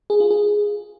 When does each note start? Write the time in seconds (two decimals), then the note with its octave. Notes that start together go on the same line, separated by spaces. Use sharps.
0.10 G#4
0.20 F4
0.31 G#4